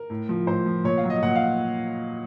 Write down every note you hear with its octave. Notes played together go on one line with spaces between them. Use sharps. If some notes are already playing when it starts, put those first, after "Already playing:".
Already playing: A#4
A2
F3
A2 C5
F3
A#2 C#5
F5
F#3
D#5
A#2 F#5
F5